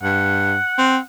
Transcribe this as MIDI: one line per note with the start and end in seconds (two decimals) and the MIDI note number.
0.03 0.57 43
0.03 1.05 78
0.78 0.97 60